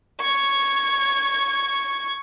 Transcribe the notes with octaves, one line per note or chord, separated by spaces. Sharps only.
C#6 G#6